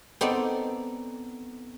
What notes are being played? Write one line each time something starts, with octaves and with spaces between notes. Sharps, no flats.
B3 C4 D#4 A4 D5